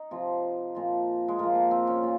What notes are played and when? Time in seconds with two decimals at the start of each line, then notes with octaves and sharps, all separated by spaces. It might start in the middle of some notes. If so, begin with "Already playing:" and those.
Already playing: D#4
0.11 C3 F3
0.75 A#2 F3
1.28 G#3
1.38 A#2 F3 A#3
1.55 A#3
1.71 C4
1.87 C#4
2.03 A#2